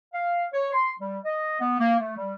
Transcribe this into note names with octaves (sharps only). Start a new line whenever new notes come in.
F5
C#5
C6
G3
D#5
B3
A#3
A3
G3